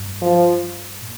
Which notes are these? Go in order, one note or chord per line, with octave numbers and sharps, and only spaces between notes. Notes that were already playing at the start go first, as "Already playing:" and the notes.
Already playing: G2
F3
A#2